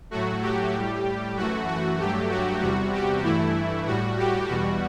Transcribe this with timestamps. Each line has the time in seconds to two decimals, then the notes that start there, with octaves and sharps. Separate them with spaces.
0.11 A2 F#3 A3 F#4
0.42 G4
0.74 A2 G3
1.36 F#2 E3 A3 F#4
1.68 F#4
1.99 G2 F#3 A3 G4
2.30 F#4
2.62 E2 C3 G3 F#4
2.93 G4
3.23 G2 E3 A3 E4
3.86 A2 G3 F#4
4.18 G4
4.49 E2 B2 G3 F#4